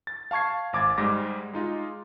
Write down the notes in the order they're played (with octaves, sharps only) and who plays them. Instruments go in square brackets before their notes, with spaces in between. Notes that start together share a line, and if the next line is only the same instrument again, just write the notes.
[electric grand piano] A6
F5 A5 C#6 G#6 C7
G#1 D6 G#6 A6
G#2 G3 G#3 G4 D6 A#6
G#3 D#4 F4